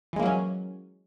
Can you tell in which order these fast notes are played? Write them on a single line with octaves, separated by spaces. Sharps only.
E3 G#3 A#3 F#3 C#4